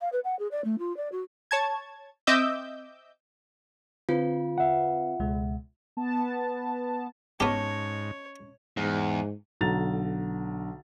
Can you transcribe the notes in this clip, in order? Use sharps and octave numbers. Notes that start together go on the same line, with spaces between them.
F5
B4
F#5
G#4
D5
A3
F4
D5
F#4
C#5 A5 G#6
C4 D#5 E5 D6 E6 G6
D3 C4 F4 B4
E5 F#5
C#2 B2 G#3
B3 A5
G#2 B3 C#4 G4 C#5 D#5 A5
E2 G#2
B1 D3 A#5 A6 F7